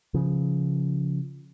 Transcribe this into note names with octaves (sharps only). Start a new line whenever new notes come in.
C#3 F3